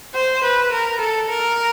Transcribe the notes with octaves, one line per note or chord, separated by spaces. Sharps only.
C5
B4
A#4
A4
A#4